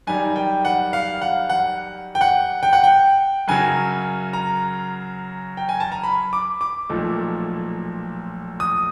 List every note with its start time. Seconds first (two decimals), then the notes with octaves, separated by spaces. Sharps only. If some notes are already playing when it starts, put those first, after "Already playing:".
0.07 F#2 D#3 G3 G#5
0.36 G5
0.65 F#5
0.93 F5
1.21 F#5
1.49 F#5
2.15 G5
2.21 F#5
2.63 G5
2.73 F#5
2.84 G5
3.48 F#2 C#3 F#3 G#5
4.33 A#5
5.57 G5
5.69 G#5
5.80 A5
5.92 A#5
6.04 B5
6.33 D6
6.61 D6
6.89 B1 A#2 F3 A3
8.60 D#6